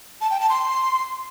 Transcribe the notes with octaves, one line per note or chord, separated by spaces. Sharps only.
A5
G5
A5
C6